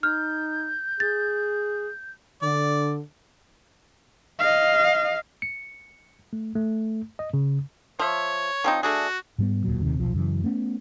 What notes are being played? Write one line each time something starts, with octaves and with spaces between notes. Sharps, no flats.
D#4 F6 G6
G#4 A6
D3 D5
D#5 F5
C#7
A3
A3
D#5
C#3
F3 C#5 E5
F3 C4 D#4
A3 D4 F#4 G#4
G#2 G3 B3
E1 D2 A#2 F#3
D#1 D#2 C3 D#3
D#1 B1 F3
F#2 C#3 E3
A3 B3 C#4